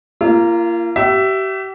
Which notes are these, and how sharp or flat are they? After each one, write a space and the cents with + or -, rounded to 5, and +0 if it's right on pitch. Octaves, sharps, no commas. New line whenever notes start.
A#3 -5 F4 -40
G4 -35 E5 +10